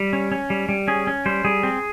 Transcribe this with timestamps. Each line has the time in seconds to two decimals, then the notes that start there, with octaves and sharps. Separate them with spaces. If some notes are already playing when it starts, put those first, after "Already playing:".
Already playing: G3
0.13 C#4
0.32 C#4
0.50 G3
0.69 G3
0.88 C#4 G#4
1.07 C#4
1.26 G3 C5
1.45 G3 G#4
1.63 C4